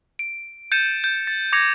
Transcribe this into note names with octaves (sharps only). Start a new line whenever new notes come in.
D7
G6 A6 C#7 D#7 E7
G6
A6
D6 G#6 A#6 C#7 F7